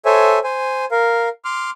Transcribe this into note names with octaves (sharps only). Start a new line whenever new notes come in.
A4 C5 C#5 E5 G#5
C5 G#5
A#4 F5
C6 D6 F6